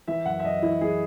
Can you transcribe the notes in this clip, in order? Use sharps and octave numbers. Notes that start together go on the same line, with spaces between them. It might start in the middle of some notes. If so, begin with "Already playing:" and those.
E3 E5
F#2 F#5
E5
F#2 D#5
E3 E4
E3 G#4